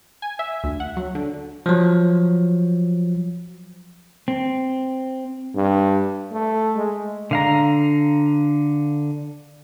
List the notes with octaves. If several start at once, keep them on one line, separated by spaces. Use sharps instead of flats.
G#5
E5
D2
F#5
F#3
D3
F3 F#3
C4
G2
A3
G#3
D3 F5 A#5